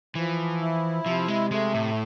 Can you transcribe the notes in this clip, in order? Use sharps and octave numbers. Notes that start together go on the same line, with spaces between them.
E3 F3
E4
C3 F3
G#3
G#3 A3
A2